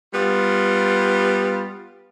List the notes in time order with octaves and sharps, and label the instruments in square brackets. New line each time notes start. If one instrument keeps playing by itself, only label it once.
[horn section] G3 B3 F4